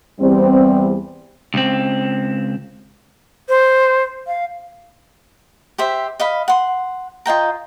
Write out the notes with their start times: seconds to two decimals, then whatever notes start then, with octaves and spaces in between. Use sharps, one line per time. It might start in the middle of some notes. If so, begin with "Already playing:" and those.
0.20 E2 G3 C4
1.54 C#2 C4
3.49 C5
4.27 F5
5.78 G4 C5 E5
6.20 D#5 F5 B5
6.48 F#5 C6
7.26 F4 D#5 G5 A#5